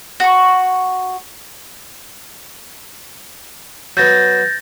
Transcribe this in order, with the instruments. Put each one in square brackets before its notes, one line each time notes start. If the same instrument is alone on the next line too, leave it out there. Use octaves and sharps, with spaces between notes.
[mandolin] F#4 C#6
[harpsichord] F#3 B3 [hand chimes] G6 A6 A#6